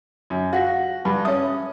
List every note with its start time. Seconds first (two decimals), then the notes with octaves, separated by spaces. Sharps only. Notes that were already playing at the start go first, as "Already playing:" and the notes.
0.30 F#2
0.53 F#4 F5 F#5 A#6
1.05 G2 B5
1.25 C#4 E5 D#6